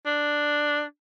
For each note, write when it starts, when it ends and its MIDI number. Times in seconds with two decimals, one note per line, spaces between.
0.06 0.83 62